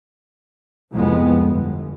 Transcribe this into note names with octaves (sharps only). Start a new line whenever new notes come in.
C2 F2 G#3 B3
G1